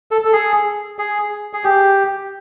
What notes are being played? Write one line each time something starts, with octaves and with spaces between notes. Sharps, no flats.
A4
A4
G#4
G#4
G#4
G4